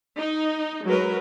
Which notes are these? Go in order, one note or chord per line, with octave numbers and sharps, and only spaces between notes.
D#4
F#3 G#3 A#4 B4